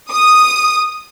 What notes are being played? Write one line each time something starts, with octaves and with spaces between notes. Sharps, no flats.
D#6